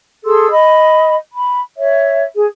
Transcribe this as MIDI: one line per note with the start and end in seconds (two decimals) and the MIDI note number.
0.24 0.49 68
0.24 0.49 69
0.24 0.49 84
0.24 0.49 88
0.50 1.17 75
0.50 1.17 83
1.33 1.59 83
1.77 2.23 73
1.77 2.23 76
2.35 2.46 68